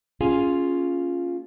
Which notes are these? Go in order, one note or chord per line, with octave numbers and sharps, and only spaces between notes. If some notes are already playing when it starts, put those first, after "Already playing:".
A#3 C#4 F4 G#4 F5 G#5